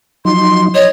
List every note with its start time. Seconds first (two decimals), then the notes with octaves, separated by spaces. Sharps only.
0.25 F3 F#3 D#4 C6
0.74 C#5 D#5